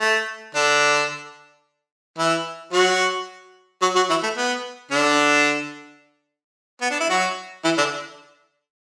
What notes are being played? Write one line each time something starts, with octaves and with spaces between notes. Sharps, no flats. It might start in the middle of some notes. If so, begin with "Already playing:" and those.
A3
D3 D4
E3 E4
F#3 F#4
F#3 F#4
F#3 F#4
E3 E4
A3
B3
D3 D4
B3
D4
E4
F#3 F#4
E3 E4
D3 D4